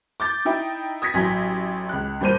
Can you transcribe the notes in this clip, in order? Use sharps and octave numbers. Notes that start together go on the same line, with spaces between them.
D6 G6 A6
D#4 E4 G5
D#6 G#6 A#6 B6
A1 F#3 G#5 C6
C#2 F#6
G2 A#2 C5 G6 D#7